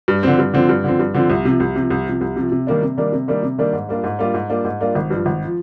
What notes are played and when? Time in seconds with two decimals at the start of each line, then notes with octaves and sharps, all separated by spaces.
0.08 G2
0.23 D3 F3 C4
0.39 G2
0.54 D3 F3 C4
0.69 G2
0.84 D3 F3 C4
0.99 G2
1.14 D3 F3 C4
1.30 C2
1.45 C3 F3
1.60 C2
1.76 C3 F3
1.90 C2
2.06 C3 F3
2.21 C2
2.36 C3 F3
2.52 C3
2.67 D#3 G3 A#3 D4
2.82 C3
2.97 D#3 G3 A#3 D4
3.12 C3
3.28 D#3 G3 A#3 D4
3.43 C3
3.58 D#3 G3 A#3 D4
3.73 G#2
3.89 G3 A#3 D4 F4
4.04 G#2
4.19 G3 A#3 D4 F4
4.34 G#2
4.49 G3 A#3 D4 F4
4.65 G#2
4.80 G3 A#3 D4 F4
4.95 G#1
5.10 G2 F3
5.26 G#1
5.44 F3